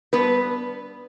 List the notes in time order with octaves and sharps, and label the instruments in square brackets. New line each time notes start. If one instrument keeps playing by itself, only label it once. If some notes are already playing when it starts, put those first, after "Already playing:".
[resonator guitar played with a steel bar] G2 B3 B4